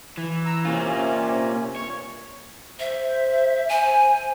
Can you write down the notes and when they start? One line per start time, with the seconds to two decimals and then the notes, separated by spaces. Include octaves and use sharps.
0.17 E3
0.45 A#5 E6
0.65 C3 A#3 C#4 F4
1.76 G2 C#5
2.79 C5 E5
3.69 G#5